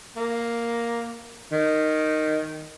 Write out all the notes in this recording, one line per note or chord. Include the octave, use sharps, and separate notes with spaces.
A#3
D#3